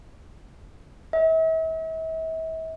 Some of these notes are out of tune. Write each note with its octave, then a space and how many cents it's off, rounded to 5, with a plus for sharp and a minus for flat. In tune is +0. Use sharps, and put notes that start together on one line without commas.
E5 -40